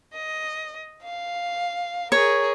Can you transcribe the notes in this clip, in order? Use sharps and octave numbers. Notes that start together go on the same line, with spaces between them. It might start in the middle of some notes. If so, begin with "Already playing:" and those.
D#5
F5
G#4 A#4 C#5